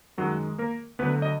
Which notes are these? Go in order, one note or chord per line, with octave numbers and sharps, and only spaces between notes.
F#2 D#3 F#3 G#3 F#4
A#3 A#4
D2 D3 F#3 B3 B4
D#5